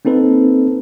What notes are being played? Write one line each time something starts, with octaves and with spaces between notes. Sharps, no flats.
A#3 C4 D#4 A4 B4